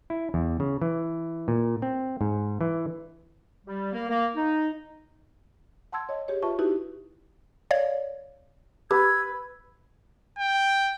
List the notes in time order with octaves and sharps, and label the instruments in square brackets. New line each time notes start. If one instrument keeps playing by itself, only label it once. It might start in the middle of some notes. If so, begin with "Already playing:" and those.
[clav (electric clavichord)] E4
E2
C#3
E3
A#2
C4
G#2
E3
[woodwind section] G3
A#3
A#3
D#4
[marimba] F#5 A5 C6 E6 G#6
C#5 D#5
G4 G#4 C#5
F4 B4 E5 A5 C#6
D#4 E4 F#4 G4 B4
[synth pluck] C#5 D5 F5
[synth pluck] G4 [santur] B4 [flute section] E6 G#6
[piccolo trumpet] G5